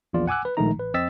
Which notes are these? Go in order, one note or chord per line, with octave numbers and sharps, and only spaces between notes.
A#1 E2 A#2 F4 D5
F#5 G#5 D6 E6 F#6
B4
A#1 D#3 G#3 A3 D#4 A#5
A1 B4
F2 C4 D#5 E6 A6 B6